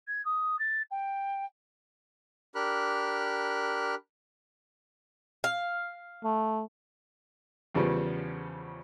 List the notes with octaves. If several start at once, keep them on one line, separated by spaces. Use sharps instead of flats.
G#6
D#6
A6
G5
D4 G4 A#4 B5 F6 F#6
F5
A3
E2 C#3 F3 G3 B3 C#4